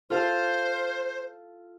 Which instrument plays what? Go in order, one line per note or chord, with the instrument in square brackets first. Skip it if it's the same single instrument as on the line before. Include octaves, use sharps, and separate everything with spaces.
[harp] F4 A4 F5 [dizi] C5